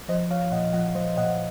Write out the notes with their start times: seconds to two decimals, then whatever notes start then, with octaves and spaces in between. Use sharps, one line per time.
0.08 F3 C5 D#5
0.31 F3 C#5 F5
0.52 A#2 D#5 F#5
0.73 F3 D#5 F#5
0.95 F3 C5 D#5
1.17 A#2 D#5 F#5